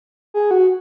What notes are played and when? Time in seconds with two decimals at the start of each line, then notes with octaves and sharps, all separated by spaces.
0.34 G#4
0.51 F#4